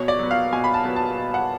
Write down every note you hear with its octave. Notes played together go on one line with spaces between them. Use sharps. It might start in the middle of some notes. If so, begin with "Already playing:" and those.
Already playing: B2 C#5
D5
F#3 B3
F5
B2 G#5
B5
A5
F#3 B3
A5
B2
F#5